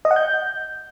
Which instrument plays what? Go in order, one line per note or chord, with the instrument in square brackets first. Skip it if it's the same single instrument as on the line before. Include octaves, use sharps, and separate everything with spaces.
[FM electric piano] D#5
F#5
G6